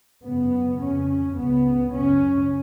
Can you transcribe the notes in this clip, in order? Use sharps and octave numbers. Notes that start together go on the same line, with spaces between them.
F#2 C#3 B3
F2 C#3 C#4
C#4
C#2 C#3 B3
F#2 C#3 C#4